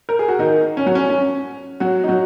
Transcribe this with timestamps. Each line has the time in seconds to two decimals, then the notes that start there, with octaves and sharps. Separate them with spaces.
0.09 A#4
0.19 G#4
0.28 F#4
0.39 D#3 D#4
0.77 C#4
0.86 F#3 F#4
0.95 C#4
1.09 C#4
1.80 F#3 F#4
2.04 D#4
2.08 F#3 F#4